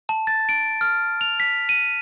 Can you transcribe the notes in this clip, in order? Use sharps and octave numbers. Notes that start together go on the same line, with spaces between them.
A5
A6
D7
F6
F7
B6
D#7